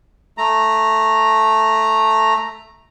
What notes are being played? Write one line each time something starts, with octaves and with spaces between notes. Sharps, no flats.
A3 A#5